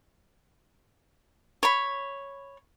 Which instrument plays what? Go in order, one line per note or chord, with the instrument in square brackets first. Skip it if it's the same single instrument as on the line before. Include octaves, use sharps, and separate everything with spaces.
[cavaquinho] C#5 B5